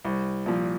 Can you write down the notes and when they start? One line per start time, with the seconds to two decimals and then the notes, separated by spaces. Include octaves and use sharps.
0.05 C2
0.46 A#2 F3